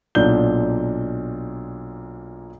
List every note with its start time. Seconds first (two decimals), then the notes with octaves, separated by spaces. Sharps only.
0.15 B1 A#2 D4 G6 G7